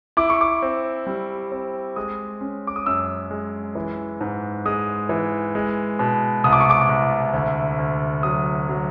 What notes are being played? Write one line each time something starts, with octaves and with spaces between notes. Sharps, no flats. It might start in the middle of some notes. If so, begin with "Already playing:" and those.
E4 D6
C#6
D6
C4
G3
C4
G#3 D#6
C#4
D6
D#6
F#2 E6
G#3
E3
G#2
G#3 D#6
E3
G#3
B2
C2 D#6
D6
C#6
D6
C2
D2
D2
F#3 D#6
F#3